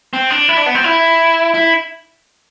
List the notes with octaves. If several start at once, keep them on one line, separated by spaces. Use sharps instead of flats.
C4
D4
E4
D4
B3
C4
E4
E4